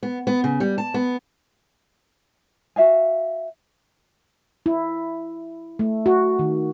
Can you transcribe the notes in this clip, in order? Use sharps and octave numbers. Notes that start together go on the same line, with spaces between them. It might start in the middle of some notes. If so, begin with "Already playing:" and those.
B3
B3
C#3
G3
A5
B3
F#4 E5 F5 G#5
E4
A3
F#4
D#3